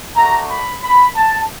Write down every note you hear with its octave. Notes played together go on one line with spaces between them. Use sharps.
A3 D4 F#4 A#5
B5
B5
A5